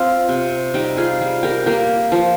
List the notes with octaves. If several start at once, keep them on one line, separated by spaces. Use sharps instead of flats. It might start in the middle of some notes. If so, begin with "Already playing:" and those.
Already playing: C4 F4
C3
G3 D#4 G4
F4 G#4
G3
G4 A#4
A#3 G4 A#4
F3